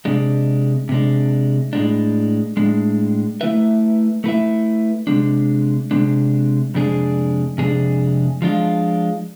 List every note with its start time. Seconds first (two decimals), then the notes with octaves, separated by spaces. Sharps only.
0.05 C3 G#3 D4
0.89 C3 G#3 D4
1.73 A2 G#3 D4
2.57 A2 G#3 D4
3.41 A3 E4 B4 E5
4.24 A3 E4 B4 E5
5.07 C3 G#3 D4
5.91 C3 G#3 D4
6.74 F2 C3 G#3 D4 G#4
7.58 F2 C3 G#3 D4 G#4
8.42 F3 G#3 D4 F4